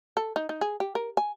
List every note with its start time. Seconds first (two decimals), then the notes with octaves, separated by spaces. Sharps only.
0.17 A4
0.36 D#4
0.49 D#4
0.61 G#4
0.80 G4
0.95 A#4
1.17 G#5